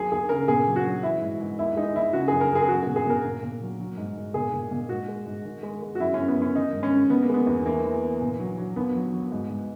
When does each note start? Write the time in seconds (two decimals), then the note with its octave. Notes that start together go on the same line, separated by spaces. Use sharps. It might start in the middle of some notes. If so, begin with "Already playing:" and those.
Already playing: D#2 F#3 G#4
0.12 D#2 G#4
0.29 C#3 A#4
0.48 A#2 G#4
0.67 F#3
0.76 F#4
0.85 F#3
1.03 E3 E4
1.21 G#2
1.40 G#2
1.59 D#2 E4
1.76 G#3 D#4
1.95 D#2 E4
2.13 C#3 F#4
2.28 F#2 G#4
2.41 A#4
2.51 F#2 G#4
2.62 G#4
2.68 F#3 F#4
2.82 A#2 G#4
2.96 G#4
3.06 A#2 A#4
3.24 A#2
3.43 A#2
3.62 F#3
3.80 F#3
3.98 G#2
4.17 G#2
4.34 A#2 G#4
4.54 A#2
4.71 A#2
4.89 G#2 F#4
5.08 G#3
5.26 G#2
5.44 D#3
5.63 G#3
5.82 G#3
5.95 F#4
6.00 F#2 E4
6.14 F#2 C#4
6.28 B3
6.37 F#2 C#4
6.56 D#3 D#4
6.73 G#2
6.83 C#4
6.92 G#2
7.10 D#3 B3
7.22 A#3
7.29 G#3 B3
7.47 E2
7.65 E3 A#3
7.85 E3
8.03 E3
8.22 A#2
8.39 F#3
8.58 F#3
8.76 D#2 B3
8.95 F#3
9.13 F#3
9.32 G#2
9.50 G#2